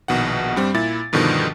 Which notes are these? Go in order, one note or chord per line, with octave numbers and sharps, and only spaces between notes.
A#1 B2 D#3 F#5
G2 G3 C4
A#2 E4 A6
G2 B2 D3 D#3 F3